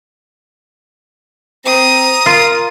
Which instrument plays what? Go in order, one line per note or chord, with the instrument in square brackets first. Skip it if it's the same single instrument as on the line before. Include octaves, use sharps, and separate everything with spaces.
[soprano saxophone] C4 [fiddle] A#5 D#6
[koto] F4 [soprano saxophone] A#4